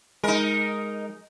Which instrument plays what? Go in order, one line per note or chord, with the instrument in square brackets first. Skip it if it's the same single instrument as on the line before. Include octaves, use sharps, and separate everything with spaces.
[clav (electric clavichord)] G#3 [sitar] D#4 A#4